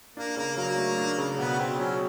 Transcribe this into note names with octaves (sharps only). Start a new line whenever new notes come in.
A#3 D4
C#3 A#3
F#3 A#3
A3
D4
C#3
B2 B3
B2 C4
F#3 C#4